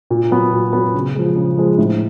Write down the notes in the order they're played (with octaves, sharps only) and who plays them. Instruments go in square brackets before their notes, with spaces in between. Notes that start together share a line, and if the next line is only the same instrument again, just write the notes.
[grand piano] A#2
F#3 B3
A#2
F#3 B3
C#3
F3 G#3
C#3
F3 G#3
A2